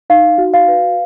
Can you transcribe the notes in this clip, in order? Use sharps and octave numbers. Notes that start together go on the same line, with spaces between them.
D#4 F5
F#4
F5
B4